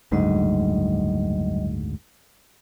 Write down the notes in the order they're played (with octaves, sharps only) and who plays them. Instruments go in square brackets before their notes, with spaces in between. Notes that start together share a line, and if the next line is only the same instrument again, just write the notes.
[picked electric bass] F#1 D2 G#2 [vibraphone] F#3 G3 D#5